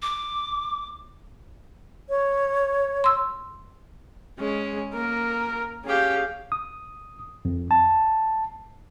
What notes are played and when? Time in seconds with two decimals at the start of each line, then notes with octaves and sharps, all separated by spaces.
0.02 D6
2.09 C#5
3.04 C6 E6
4.39 G#3 C#4
4.94 A#3 A#4
5.85 C#4 G4 G#4 F5
6.52 D#6
7.45 F2
7.71 A5